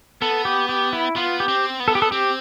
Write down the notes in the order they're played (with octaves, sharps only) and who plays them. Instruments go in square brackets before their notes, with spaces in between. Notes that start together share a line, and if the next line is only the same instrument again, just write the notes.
[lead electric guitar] B3 [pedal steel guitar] A4
[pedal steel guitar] G4
G4
E4
[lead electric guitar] B3 [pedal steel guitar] F4
[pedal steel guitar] G4
[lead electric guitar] C4
B3
[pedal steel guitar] A4
G4
A4
[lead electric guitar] C4 [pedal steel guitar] G4